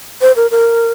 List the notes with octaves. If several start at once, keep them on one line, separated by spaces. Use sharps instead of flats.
C5
A#4
A#4